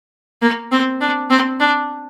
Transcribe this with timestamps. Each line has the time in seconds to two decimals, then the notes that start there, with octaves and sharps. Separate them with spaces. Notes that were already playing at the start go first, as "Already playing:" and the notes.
0.42 A#3
0.72 C4
1.01 D4
1.30 C4
1.60 D4